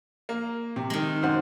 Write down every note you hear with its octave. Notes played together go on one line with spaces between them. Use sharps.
A#3
C3
D#3 G#3
F#2 C5 F#5